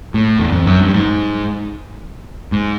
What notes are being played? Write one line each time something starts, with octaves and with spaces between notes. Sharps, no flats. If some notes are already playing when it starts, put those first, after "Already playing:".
A2
E2
F2
F#2
G2
G#2
G#2